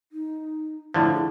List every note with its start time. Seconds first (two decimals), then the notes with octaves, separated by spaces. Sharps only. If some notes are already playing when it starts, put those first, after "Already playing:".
0.12 D#4
0.94 A2 D3 F3 E4
1.14 G#4